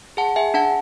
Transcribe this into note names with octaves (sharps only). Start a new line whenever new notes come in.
G#4 F#5 A5
G#4 E5 G#5
D4 F#5 A5